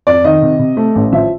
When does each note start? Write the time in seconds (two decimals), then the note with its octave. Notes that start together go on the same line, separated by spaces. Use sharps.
0.07 F2 D5
0.24 D#3 D#5
0.42 C3
0.59 C3
0.77 A3
0.95 A1
1.12 F3 E5